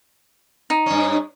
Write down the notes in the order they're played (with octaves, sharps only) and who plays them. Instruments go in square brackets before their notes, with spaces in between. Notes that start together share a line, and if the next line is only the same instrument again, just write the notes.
[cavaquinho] D#4
[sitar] G2 C#4